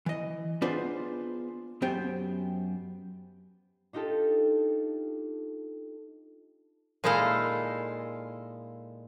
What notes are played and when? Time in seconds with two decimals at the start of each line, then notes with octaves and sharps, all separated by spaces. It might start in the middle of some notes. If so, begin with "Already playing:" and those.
0.06 E3 D#5
0.62 B3 D4 F4 G#4 B4 C5
1.82 F#2 B3 G4 C5 G5
3.93 D4 D#4 F4 G4 A4
7.04 A#2 G#3 D#4 E4 A4 F5